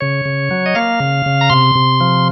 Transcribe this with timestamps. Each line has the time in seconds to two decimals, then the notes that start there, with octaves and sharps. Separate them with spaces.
0.01 C#3 C#5
0.25 C#3
0.51 F#3
0.66 D#5
0.75 A#3 F5
1.00 C#3
1.26 C#3
1.41 A#5
1.50 C3 C6
1.75 C3
2.01 F3